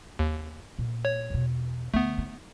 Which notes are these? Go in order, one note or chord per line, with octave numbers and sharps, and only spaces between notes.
D#2
A#2
C#5
E2 B2
D2 A3 B3
D#4